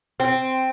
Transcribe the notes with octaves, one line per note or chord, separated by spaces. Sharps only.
C4